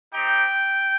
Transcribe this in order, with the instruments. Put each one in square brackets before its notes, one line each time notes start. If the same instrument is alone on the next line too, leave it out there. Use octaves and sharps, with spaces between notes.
[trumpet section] C4 D#4 G4 G5